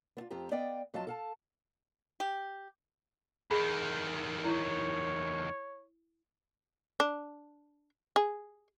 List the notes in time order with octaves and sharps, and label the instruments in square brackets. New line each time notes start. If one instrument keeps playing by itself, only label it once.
[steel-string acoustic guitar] B3 F4
F2 C4 F4 G4 A#5
B3 D5 D#5 F5 G5
F2 F#3 F4 D#5 F5 A5
A4 F5 A5
[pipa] G4
[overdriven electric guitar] E2 D#3 [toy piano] G#4 B5
[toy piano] E4 [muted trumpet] C#5
[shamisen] D4
G#4